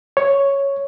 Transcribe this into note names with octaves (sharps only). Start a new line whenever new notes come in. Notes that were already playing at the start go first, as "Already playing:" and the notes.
C#5